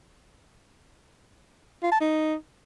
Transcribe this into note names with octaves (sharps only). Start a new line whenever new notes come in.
F4
A5
D#4